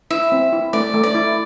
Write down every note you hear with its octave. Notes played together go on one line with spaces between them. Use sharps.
E4 E5
C4
E4
A3 D5
A3
D5
E4